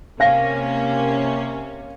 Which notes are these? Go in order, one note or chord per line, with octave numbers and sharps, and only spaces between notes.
C3 A#3 C#4 F5 A#6